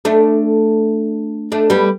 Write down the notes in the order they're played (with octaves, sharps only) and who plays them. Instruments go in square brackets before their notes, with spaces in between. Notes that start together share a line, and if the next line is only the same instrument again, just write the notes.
[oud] A3 D4
A3 D4
G3 B3